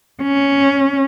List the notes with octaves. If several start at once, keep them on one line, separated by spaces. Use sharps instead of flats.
C#4